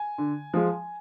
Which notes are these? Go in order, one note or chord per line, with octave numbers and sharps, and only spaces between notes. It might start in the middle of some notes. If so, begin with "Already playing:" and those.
Already playing: G#5
D3
F3 G#3